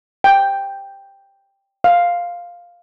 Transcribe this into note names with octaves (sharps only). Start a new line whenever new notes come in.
G5
F5